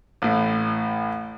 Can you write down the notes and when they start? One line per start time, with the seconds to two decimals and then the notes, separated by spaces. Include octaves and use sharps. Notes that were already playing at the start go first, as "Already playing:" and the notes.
0.22 A1 A2